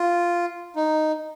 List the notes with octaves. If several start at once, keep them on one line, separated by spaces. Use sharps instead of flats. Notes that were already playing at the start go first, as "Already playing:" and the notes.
Already playing: F4
D#4